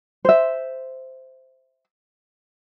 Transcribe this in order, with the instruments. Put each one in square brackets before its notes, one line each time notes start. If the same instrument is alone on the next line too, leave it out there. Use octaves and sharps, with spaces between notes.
[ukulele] C5 E5